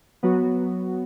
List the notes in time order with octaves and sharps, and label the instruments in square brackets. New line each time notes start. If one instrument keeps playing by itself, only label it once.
[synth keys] F#3 B3 F#4